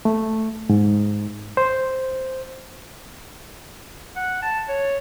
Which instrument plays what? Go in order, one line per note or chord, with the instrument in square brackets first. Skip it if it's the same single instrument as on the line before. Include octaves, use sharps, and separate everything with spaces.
[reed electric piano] A3
G#2
C5
[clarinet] F#5
A5
C#5